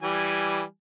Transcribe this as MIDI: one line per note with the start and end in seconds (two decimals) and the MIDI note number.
0.02 0.62 52
0.02 0.62 55
0.02 0.62 80